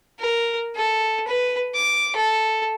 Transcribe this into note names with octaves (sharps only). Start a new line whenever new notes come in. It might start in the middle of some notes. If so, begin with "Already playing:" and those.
A#4
A4
B4
D6
A4